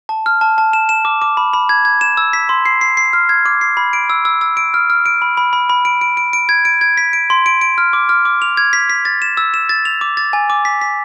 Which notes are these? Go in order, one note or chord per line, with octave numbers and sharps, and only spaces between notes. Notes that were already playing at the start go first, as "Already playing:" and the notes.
A5
F6
A5
A5
E7
E7
D6
D6
B5
B5
G#6
G#6
E7
E6
B6
C6
C7
C7
C7
F6
G#6
D6
C7
B5
D7
E6
E6
E6
D7
F6
F6
D7
B5
B5
B5
B5
D7
D7
D7
D7
G#6
D7
G#6
B6
D7
C6
D7
D7
F6
D6
F6
D6
F7
G#6
B6
B6
A6
E7
E6
E7
A6
F7
D6
A6
G#5
D6
B6
B6